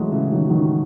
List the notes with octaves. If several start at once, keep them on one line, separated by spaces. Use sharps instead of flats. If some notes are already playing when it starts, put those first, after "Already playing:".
Already playing: E3 F#3 G#3 A3
C#3 E3
D#3 F#3
D#3 F#3